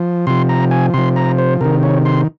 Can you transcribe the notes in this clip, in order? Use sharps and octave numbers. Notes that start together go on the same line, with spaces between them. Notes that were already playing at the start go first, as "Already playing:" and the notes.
Already playing: F3
C3 F3 C6
A#5
G#5
C3 F3 C6
A#5
C5
C3 D#3 A#4
C#5
C6